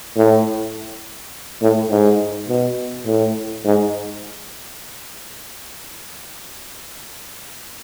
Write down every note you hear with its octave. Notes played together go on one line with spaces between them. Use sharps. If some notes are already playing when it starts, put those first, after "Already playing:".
A2
A2
G#2
B2
A2
G#2